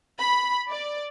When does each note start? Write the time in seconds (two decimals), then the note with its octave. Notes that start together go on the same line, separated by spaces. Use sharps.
0.20 B5
0.70 D5